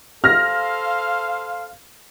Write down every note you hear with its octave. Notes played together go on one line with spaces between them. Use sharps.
A4 C5 F5 F6 A#6